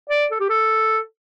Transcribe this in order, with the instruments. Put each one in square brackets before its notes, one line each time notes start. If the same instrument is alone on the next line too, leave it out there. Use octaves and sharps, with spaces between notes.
[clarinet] D5
A4
G4
A4